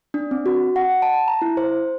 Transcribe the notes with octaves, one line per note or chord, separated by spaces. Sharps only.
D4
C4
F#4
F#5
A5
A#5
E4
C5